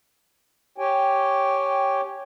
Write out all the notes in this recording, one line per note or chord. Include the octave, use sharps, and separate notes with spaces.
G4 C#5 G5 G#5